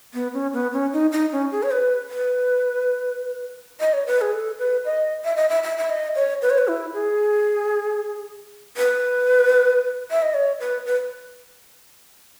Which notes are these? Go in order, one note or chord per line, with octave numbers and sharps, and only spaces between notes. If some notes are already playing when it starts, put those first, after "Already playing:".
B3
C#4
B3
C#4
D#4
D#4
C#4
G#4
C#5
B4
B4
D#5
C#5
B4
G#4
A4
B4
D#5
E5
D#5
E5
E5
E5
D#5
C#5
B4
C#5
B4
E4
G#4
B4
E5
D#5
C#5
B4
B4